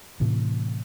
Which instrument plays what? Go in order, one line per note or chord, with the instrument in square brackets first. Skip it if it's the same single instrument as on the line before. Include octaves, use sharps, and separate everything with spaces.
[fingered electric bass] A2 C3 E3